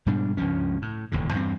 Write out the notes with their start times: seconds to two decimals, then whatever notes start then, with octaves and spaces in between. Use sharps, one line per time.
0.06 G#2 B2 G3 D4
0.37 C#2 G2 F3 C#4
0.82 A2
1.12 E1 D#2 A2 D3
1.33 E2 G2 F#3 C4